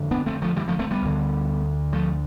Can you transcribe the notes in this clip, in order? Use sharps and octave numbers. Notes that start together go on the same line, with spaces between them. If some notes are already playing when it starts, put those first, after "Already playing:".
Already playing: F2 D3
B3 D4
A3 C4
F3 A3
E3 G3
F3 A3
A3 C4
G3 B3
D2 D3
F3 A3